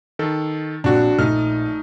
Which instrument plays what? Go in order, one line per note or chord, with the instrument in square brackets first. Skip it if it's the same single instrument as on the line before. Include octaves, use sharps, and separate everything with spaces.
[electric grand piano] D#3 A4
[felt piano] A#1 A#3 C4 [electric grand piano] D4 F#4
[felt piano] A#1 [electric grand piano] A3 D#4 F6